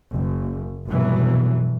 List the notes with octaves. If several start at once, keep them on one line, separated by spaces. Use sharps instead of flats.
F#1
F1 G2 B2 E3 F#3